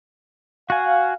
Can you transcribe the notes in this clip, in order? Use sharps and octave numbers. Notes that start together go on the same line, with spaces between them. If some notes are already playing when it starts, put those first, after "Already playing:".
F#4 F5 G#5